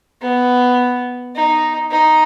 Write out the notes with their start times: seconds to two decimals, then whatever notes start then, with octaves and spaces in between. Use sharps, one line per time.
0.21 B3
1.35 D#4
1.91 D#4